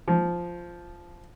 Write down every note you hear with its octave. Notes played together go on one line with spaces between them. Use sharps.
F3